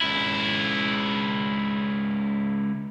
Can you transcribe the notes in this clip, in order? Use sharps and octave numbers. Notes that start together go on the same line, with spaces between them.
C#2 E4